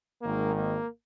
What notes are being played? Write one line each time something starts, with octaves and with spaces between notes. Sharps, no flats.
G#1 G#2 D#3 A#3
A#3